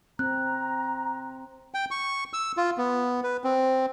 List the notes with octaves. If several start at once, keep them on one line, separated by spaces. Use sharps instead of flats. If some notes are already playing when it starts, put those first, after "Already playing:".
C4 A#5 F#6
G5
C#6
E6
F4
B3
B4
C4